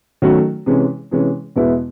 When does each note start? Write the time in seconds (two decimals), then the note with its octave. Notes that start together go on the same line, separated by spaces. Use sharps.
0.22 D#3 F#3 A3 C#4 F#4
0.66 C3 E3 G#3 C#4
1.11 C3 E3 G#3 C#4
1.56 E2 B2 G#3 B3 E4